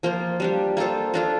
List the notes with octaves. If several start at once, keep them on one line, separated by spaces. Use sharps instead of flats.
F3 A#3 F4 C5
G3 D4 G4
A#3 F4 A4 C5
A#3 D4 F4 A4